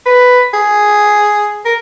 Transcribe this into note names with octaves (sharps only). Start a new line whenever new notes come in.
B4
G#4
A#4